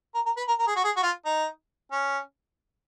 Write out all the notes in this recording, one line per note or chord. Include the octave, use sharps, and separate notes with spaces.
A#4
A#4
B4
A#4
A#4
G#4
F#4
G#4
F#4
F4
D#4
C#4